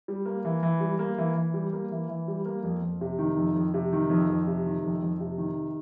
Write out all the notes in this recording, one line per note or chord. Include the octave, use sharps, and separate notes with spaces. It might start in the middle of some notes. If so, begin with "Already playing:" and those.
G3
A#3
E3
E3
G3
A#3
E3
E3
G3
A#3
E3
E3
G3
A#3
F2
F2
C3
D#3
F2
F2
C3
D#3
F2
F2
C3
D#3
F2
F2
C3
D#3